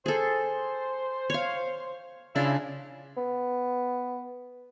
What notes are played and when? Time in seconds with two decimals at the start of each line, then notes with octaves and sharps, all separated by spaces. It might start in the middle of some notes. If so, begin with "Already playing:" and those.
0.06 G#4 A4 C5
1.30 C#5 F5
2.36 C#3 D4 E4 F4
3.17 B3